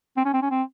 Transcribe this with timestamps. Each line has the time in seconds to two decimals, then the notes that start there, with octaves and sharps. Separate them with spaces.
0.17 C4
0.25 C#4
0.34 C4
0.42 C#4
0.51 C4